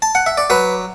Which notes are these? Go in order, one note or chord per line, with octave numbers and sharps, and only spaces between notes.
A5
F#5
E5
D5
F#3 B4